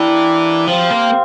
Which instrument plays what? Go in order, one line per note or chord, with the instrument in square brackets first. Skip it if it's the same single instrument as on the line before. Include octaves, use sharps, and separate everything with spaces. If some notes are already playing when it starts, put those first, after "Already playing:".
Already playing: [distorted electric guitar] E3 [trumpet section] A#3 D4 G4 D5 G5
[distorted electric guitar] F3 [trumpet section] C4 G4 C5 F5
[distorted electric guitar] A#3